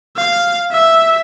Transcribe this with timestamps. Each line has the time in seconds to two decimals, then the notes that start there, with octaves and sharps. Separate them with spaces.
0.17 F5
0.71 E5